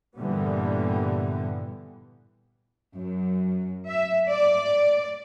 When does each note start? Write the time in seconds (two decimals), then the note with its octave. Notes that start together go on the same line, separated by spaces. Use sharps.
0.17 G2 A#2 D3 E3 G3 B3
2.95 F#2
3.88 E5
4.28 D5